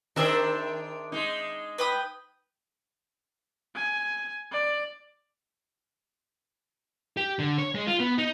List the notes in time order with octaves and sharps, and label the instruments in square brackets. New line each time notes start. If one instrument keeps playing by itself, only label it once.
[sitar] D#3 D4 G#4 [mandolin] C5 E5 A#5
[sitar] G#3 D#4
[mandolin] B4 G5 D#6
[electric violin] G#5
D5
[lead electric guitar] G4
D3
C#5
G#3
F4
B3
D#4